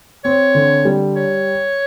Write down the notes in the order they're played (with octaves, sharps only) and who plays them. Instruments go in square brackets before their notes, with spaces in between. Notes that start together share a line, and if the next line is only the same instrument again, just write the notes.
[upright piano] C4 [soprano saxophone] C#5
[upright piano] D3
G3
[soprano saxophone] C#5